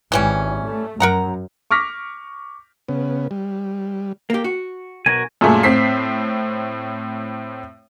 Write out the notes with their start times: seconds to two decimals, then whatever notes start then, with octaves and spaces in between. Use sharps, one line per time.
0.12 G#1 E3 G3 C#4
0.65 A3
1.00 F#2 A#4 F#5 A#5
1.71 C#6 D6 F6 A#6 B6
2.89 C#3 B3
3.31 G3
4.30 A#3 G4
4.44 F#4
5.06 B1 F#4 A#4 G#5
5.41 F#2 A#2 G#3 A3
5.63 A2 C4 B6 C7